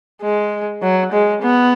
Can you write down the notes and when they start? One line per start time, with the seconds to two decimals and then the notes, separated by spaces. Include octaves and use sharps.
0.22 G#3
0.82 F#3
1.12 G#3
1.42 B3